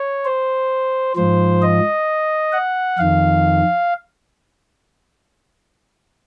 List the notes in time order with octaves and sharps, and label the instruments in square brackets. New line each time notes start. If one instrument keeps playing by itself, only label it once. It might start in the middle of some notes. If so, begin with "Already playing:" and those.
Already playing: [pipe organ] C#5
C5
G#2 F3 C5
D#5
F#5
F2 D#3 F5